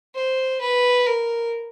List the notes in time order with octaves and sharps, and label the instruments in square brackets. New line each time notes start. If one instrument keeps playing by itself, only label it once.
[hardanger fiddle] C5
B4
A#4